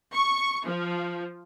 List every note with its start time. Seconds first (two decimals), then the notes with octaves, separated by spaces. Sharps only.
0.13 C#6
0.65 F3